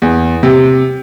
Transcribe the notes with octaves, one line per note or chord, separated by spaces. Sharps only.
E2
C3